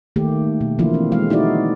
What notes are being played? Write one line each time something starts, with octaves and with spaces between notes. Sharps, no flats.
D#3 A3 A#3 G4
B2
D3 E3 F3 A#3 E4 F4
C4
G#3 F5
D#4 E4 F#4 D5